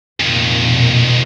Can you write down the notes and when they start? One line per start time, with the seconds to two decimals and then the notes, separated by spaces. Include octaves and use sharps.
0.20 F1 F2 A#2 D#3
0.70 B2